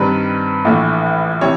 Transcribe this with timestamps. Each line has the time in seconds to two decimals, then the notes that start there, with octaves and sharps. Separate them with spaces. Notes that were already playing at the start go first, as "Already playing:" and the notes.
Already playing: G2 D#3 G3 C4 B4
0.65 A#1 A2 E3 A3
1.41 C3 E3 C#5